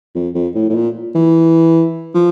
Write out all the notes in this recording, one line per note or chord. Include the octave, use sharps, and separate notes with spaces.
F2
F2
A2
A2
A#2
E3
F3